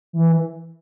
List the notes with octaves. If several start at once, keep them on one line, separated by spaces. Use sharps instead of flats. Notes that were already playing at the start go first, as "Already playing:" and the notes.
E3